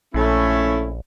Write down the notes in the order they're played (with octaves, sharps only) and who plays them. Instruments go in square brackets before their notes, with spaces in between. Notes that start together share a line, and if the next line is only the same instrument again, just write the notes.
[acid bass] A#1 [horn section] A3 C#4 E4